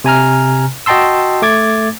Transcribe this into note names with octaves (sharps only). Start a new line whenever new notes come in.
C3 G#5 A#5 F6
F#4 D#5 G5 A5 C6 E6
A3 D6 G#6 A6